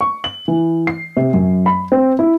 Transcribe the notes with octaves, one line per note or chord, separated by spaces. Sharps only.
C#6
F#7
E3
C7
C3
F#2
B5
C4
E4